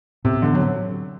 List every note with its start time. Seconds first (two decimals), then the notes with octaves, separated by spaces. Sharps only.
0.24 A2 C3
0.42 D3 E3 B3
0.55 F#3